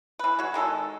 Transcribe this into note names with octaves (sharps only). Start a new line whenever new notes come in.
E3 B4
G#3 F#4
D#3 G#3 G#4 A4